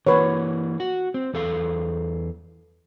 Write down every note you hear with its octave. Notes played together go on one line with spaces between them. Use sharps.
E3 A#3 B4 C#5
F#4
C4
E2 A4 F5